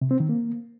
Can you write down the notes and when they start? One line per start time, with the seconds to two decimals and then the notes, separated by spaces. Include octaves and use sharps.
0.02 C3
0.11 C4
0.20 D#3
0.29 A#3